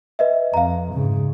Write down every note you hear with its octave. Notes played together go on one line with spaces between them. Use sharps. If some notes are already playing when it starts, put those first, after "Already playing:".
B4 D#5 E5
F2 F5 A#5
G#2 C#3